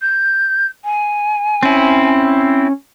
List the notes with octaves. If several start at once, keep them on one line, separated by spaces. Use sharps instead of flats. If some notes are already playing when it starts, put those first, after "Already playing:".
G6
G#5
C4 C#4 E4